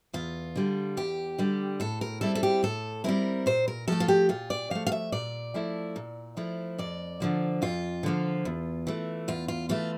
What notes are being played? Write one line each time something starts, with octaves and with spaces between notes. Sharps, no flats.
E2 F4
D3 G3
E2 G4
D3 G3
A2 A4
A#4
G3 C4 E4 A4
A4
G4
A2 A4
G3 C4 E4 A#4
A#2 C5
A#4
F3 A3 A4
F4
G4
A#2 F4
D5
F3 A3 F5
F5
E5
A#2 D5
F3 A3 E4
A#2
F3 A3 E4
F2 D5
D3 F3 A#3
F2 F4
D3 F3 A#3
E2
E3 A3
E2 F4
F4
E3 A3 F4